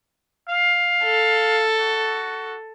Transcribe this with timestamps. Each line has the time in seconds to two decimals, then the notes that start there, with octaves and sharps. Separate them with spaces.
0.49 F5
1.03 A4
1.79 F#4